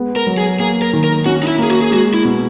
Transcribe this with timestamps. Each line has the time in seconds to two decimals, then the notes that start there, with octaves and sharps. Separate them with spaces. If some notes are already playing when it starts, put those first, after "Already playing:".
Already playing: G#3 B3
0.16 A#4
0.27 F#3
0.38 G#4
0.59 A#3 G#4
0.82 A#4
0.93 D#3
1.04 A#4
1.26 C#4 F#4
1.43 D#4
1.47 E4
1.59 A#3 G#4
1.70 F#4
1.81 G#4
1.91 G#3 F#4
2.14 E4
2.25 B2